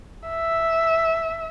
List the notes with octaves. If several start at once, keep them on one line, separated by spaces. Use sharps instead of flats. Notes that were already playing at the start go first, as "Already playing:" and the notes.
E5